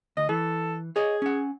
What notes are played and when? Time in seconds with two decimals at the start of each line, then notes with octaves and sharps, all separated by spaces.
0.17 D2 D#5
0.29 E3 A4
0.96 G#4 C#5 D#5
1.22 C#4 F#5